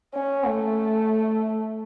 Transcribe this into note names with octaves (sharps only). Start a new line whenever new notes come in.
C#4
A3